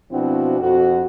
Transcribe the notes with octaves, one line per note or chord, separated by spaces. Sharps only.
B2 F3 C4 D4 E4 F#4
F2 F#4